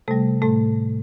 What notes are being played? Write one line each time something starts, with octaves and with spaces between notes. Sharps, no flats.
C3 G3 A3 A4
A2 A3 A4